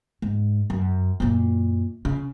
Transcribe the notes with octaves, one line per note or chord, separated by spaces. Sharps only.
G#2
F#2
F#2 A#2
C#3